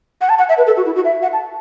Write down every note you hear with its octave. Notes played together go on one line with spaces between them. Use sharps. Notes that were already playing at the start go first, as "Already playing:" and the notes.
F#5
A5
F#5
E5
B4
A4
F#4
E4
F#4
E5
F#5
A5